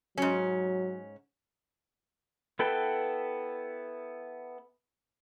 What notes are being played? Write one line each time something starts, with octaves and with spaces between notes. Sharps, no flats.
G#2 F#3 C#4
B3 E4 A4 B4 G5